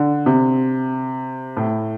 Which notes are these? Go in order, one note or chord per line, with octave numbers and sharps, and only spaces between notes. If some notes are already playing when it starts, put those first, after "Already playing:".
Already playing: D3
C3
A2